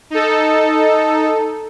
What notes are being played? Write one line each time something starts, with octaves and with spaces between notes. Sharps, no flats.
D#4 A4